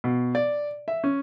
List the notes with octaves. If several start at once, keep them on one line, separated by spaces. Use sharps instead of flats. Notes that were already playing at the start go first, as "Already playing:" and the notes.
B2
D5
E5
C#4